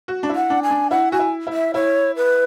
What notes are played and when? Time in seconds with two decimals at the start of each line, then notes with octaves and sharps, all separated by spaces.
0.08 F#4
0.23 D4
0.29 E4
0.36 F#5
0.50 D4
0.63 G#5
0.70 D4
0.91 E4 F#5
1.12 F#4 G#5
1.19 E4
1.47 E4
1.53 E5
1.74 E4 C#5
2.16 B4